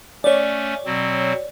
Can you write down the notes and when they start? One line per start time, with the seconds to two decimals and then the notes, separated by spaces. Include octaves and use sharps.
0.24 A3 C#4 C#5 D5
0.86 B2 F#3 C4